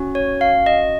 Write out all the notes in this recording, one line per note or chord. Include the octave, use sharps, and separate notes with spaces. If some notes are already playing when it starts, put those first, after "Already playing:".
Already playing: C#4 F#4
C#5
F5
D#5